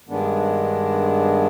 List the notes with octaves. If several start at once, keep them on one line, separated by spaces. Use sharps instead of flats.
G2 D#3 G#3 B3 D4